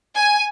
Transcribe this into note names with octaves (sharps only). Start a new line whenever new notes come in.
G#5